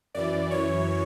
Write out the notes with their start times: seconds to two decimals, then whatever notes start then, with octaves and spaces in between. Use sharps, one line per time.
0.15 F#2 E3 D5
0.51 F#2 E3 C#5